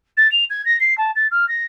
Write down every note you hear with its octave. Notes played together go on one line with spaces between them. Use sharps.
A6
F7
G#6
A#6
C7
A5
A6
F6
A#6